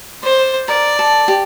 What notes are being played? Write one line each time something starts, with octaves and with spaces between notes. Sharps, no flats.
C5 D5
A#4 D5
A4
G4